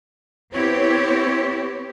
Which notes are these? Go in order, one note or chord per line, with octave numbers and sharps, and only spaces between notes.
B3 C4 E4 G4 C#5